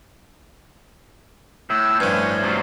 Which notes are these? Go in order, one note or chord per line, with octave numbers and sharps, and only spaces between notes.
A2 E6
G2 F3 C#4
C3 F#3 F4